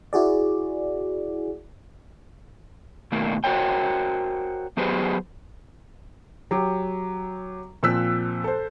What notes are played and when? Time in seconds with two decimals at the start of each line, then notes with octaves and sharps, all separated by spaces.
0.13 E4 F#4 G#4 D5
3.12 B2 D#3 A3 A#3
3.44 F#4 A#4 C5 C#5 G5
4.77 F#3 B3 G4 G#4 B4 C5
6.51 F#3 G4
7.83 A#2 F3 C4 E6 F#6 B6
8.44 A4 C5